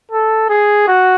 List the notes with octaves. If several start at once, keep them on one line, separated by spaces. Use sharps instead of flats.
A4
G#4
F#4